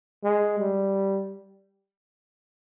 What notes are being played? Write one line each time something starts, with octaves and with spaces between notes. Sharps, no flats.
G#3
G3